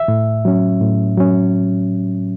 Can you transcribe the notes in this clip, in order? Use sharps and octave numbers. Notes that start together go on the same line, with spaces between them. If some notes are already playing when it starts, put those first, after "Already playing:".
Already playing: E5
A2
F#3 C#4
A2
F#3 C#4